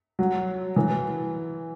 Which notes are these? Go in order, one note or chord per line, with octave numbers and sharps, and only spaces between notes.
F#3
E3